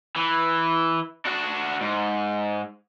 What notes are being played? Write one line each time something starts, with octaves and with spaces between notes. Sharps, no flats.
E3
D4 F#4
G#2